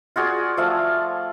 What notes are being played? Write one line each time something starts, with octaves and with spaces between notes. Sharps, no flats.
F4 F#4 G#4 D5
F3 A3 F5